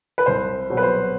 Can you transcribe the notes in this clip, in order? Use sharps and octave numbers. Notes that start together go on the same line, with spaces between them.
B4
C2 C5
B2 F#3
B4
C5